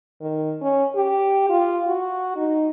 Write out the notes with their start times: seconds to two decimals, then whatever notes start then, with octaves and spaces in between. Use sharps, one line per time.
0.21 D#3
0.61 C#4
0.95 G4
1.50 F4
1.87 F#4
2.36 D#4